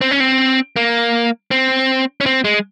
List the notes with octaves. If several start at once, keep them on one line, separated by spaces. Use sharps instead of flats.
C4
C#4
C4
A#3
C4
C#4
C4
G#3